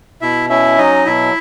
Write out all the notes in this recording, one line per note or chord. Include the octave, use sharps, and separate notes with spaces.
B2 E4 E5
C#4 E4 E5
F#3 D#4 D#5
B2 E4 E5